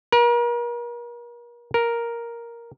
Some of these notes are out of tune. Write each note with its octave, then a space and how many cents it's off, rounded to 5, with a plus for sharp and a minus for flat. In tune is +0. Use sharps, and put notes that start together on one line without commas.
A#4 +40
A#4 +5